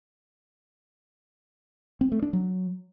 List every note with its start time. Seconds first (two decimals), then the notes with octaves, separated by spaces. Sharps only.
2.01 C4
2.12 A3
2.22 D4
2.33 F#3